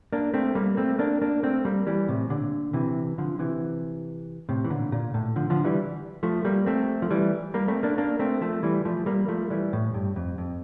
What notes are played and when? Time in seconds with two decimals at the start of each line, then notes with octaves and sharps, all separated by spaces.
0.13 A#3 D4
0.34 A3 C4
0.55 G3 A#3
0.77 A3 C4
0.99 A#3 D4
1.22 A#3 D4
1.43 A3 C4
1.65 G3 A#3
1.87 E3 G3
2.08 A2 C3
2.30 A#2 D3
2.73 C3 E3
3.18 D3 F3
3.39 C3 E3
4.49 A2 C3
4.64 E3
4.70 A#2 D3
4.92 A#2
5.14 A2
5.36 D3 F3
5.50 D3 F3
5.65 E3 G3
6.23 F3 A3
6.45 G3 A#3
6.66 A3 C4
7.02 F3
7.11 E3 G3
7.54 G3 A#3
7.68 A3 C4
7.83 A#3 D4
7.98 A#3 D4
8.19 A3 C4
8.41 F3 A3
8.63 E3 G3
8.85 F3 A3
9.06 G3 A#3
9.28 F3 A3
9.50 E3 G3
9.73 A2
9.94 G2
10.16 F2
10.38 F2